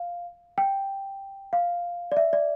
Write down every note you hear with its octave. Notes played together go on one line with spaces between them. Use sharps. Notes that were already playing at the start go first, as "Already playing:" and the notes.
Already playing: F5
G5
F5
D5
E5
D5